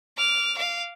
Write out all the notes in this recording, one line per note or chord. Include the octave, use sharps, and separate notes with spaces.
D6 F6
F5 D6